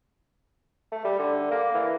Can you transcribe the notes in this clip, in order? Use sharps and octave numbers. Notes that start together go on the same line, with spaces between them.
A3
G3
D3
A#3
E3